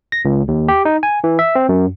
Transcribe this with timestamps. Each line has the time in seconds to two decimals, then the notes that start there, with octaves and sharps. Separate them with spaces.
0.12 A#6
0.25 C#2
0.48 D#2
0.68 G4
0.85 D#4
1.03 G#5
1.24 E3
1.39 E5
1.55 C4
1.69 F#2